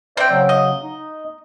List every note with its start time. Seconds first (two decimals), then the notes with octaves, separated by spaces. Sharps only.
0.17 C4 C5 D5 E5 G5
0.30 C#3 F#3
0.49 D#5
0.83 D#4